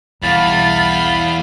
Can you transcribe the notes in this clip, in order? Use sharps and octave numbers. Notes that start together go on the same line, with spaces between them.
B1 E2 G3 F5 B5 A6